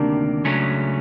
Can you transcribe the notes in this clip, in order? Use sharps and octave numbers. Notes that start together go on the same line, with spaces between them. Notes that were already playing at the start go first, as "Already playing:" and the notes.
Already playing: D2 C3 D#3 G3 A#3 D4
C#2 C#3 F#3 A3 C#4